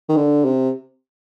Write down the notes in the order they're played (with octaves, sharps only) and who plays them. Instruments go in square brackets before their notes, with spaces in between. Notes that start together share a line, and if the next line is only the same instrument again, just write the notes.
[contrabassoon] D#3
D3
C3